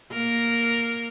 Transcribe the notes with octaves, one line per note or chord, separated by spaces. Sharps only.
A#3 A#4